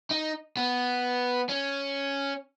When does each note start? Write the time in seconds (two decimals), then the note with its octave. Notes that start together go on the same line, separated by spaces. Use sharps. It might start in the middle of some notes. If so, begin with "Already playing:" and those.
0.11 D#4
0.57 B3
1.50 C#4